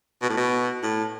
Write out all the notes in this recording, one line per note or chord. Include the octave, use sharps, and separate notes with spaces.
B2
A2
B2
A2